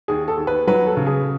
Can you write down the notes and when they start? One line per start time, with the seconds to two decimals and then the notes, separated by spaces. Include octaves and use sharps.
0.08 D#2 G#4
0.28 A4
0.38 D#2
0.47 B4
0.67 F#3 B4
0.87 A4
0.97 C#3
1.07 G#4